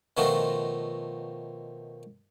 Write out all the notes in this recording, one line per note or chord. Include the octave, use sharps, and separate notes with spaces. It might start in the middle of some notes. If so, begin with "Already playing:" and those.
B2 D#3 F3 A3 F4 F#4